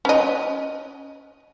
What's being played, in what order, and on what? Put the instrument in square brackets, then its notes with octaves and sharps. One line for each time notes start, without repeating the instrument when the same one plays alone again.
[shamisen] C#4 D#5